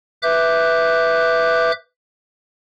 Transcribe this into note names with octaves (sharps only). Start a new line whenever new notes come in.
B4 E5 D6 F#6 G6